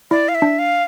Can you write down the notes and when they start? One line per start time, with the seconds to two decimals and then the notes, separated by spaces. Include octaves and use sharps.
0.11 E4 D5
0.29 F5
0.35 E5
0.42 D4
0.59 F5